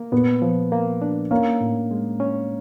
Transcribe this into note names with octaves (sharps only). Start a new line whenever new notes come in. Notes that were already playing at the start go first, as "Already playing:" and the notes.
Already playing: A#3
A#2 B3
F3
A#3
D4
A#3 C#4
A2
G#3
C#4